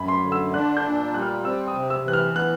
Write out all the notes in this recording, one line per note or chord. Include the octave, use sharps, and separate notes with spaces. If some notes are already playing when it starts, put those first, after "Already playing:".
Already playing: F#2 B5
C6
D3
E6
D4 F#6
G6
A#2
G3 F#6
F6
C4 E6
D#6
C3
E6
E3 F#6
F6
B3 F#6